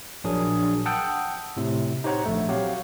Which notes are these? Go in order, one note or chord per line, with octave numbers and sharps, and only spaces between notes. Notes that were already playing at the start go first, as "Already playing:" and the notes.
A#1 F#3 D4 G#4 A#4 D#6
F#5 G5 A5 D#6 E6
A2 C3
D#4 G4 C5 C#5 F#5 A#5
A#1 A3
F#3 C4 G4 C#5 F5 F#5